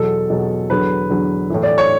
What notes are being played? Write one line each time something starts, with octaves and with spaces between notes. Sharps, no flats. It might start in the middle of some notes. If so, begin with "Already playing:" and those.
Already playing: E2 B2 F#3 A4
E2 B2 F#3
E2 D3 F#3 B4
E2 D3 F#3
A2 E3
D5
C#5